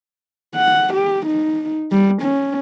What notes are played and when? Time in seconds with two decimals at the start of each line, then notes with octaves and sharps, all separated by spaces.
0.55 F#5
0.94 G4
1.26 D#4
1.91 G3
2.22 C#4